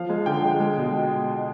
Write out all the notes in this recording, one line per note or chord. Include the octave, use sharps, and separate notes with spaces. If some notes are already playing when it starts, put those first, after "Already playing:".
Already playing: F3 F5
G#3
D3 G5
G#3
G#3
B2